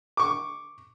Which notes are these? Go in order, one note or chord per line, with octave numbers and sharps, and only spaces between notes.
C#6 D6